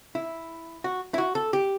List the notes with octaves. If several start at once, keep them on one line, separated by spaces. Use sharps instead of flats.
E4
F#4
E4
F#4
A4
G4